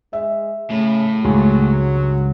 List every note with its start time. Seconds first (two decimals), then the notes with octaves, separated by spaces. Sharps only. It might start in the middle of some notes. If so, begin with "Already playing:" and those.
0.13 G#3 E5
0.71 A2 C#3
1.25 C#2 G2 F#3 G#3